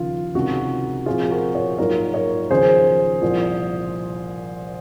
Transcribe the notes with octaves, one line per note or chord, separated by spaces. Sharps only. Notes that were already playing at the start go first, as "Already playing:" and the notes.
Already playing: D#2 C#3 F3 F4
C#2 C3 D#3 G#3 D#4 F#4
A#2 F3 C4 F4 G#4
F#4 A#4
A#4 C#5
G#2 F#3 A#3 F4 A#4 C#5
A#4 C#5
D#2 C#3 F3 G#4 C5
C2 A#2 F3